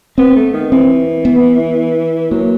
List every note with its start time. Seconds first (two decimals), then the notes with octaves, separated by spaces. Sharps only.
0.18 B3 C4
0.35 A3
0.53 D#3
0.72 E3 C4
1.25 B3
2.31 F#3 A#3